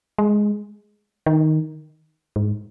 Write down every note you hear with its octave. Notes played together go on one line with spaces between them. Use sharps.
G#3
D#3
G#2